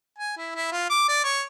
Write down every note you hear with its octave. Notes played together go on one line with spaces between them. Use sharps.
G#5
E4
E4
F4
D6
D5
C#5